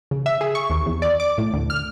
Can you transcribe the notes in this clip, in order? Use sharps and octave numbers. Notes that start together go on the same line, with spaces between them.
C#3
E5
G#4
C#6
D#2
E2
D5
D6
A2
D2
F6